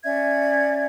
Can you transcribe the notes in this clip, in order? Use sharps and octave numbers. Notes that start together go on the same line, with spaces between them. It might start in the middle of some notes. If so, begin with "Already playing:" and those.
C#4 D5 E5 G#6